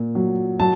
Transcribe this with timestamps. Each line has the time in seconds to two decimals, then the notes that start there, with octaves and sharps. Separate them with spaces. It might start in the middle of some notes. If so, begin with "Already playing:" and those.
Already playing: A#2
0.15 F#3
0.59 F#3 A5